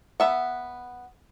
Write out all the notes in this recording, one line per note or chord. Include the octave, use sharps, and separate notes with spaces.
B3 E5 F#5